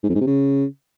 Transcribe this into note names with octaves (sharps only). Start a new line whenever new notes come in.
G#2
F2
G#2
C3
C#3